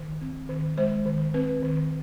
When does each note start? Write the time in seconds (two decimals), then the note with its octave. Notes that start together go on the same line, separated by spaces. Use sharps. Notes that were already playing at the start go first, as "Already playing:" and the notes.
Already playing: D#3
0.21 C4
0.49 D#3
0.77 G#3 C5
1.06 D#3
1.34 C4 B4
1.62 D#3